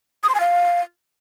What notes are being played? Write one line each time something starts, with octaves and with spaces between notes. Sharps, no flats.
D#6
C6
G#5
F5